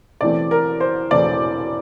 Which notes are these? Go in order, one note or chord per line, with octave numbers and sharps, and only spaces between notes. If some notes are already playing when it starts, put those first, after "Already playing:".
E1 E2 E3 A3 C4 D5
A#4
C5
E1 E2 E3 A3 C4 D5